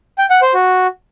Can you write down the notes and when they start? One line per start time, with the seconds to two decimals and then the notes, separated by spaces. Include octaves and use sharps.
0.18 G5
0.30 F#5
0.42 C5
0.54 F#4